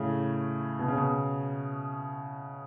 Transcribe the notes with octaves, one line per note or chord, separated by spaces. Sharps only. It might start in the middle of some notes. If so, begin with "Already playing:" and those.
Already playing: A2 C#3
B2
C#3
B2